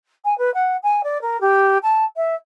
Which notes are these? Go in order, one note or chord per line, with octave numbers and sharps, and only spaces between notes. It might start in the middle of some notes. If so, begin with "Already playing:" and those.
G#5
B4
F#5
G#5
D5
A#4
G4
A5
E5